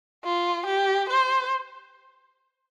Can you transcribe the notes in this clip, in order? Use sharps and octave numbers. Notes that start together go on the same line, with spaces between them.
F4
G4
C5